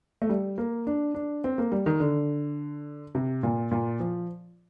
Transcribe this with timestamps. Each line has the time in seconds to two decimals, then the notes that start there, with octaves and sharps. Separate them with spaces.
0.22 A3
0.29 G3
0.58 A#3
0.87 D4
1.15 D4
1.44 C4
1.58 A#3
1.72 G3
1.86 D#3
2.00 D3
3.15 C3
3.43 A#2
3.71 A#2
4.00 F3